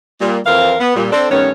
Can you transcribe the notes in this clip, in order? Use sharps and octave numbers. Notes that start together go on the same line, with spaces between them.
A#2 G3
F2 E3 C4 A#4 F5
B3
A#2 G3
C4 D4 A4
G2 D#3 A3 B3 C#4 C#5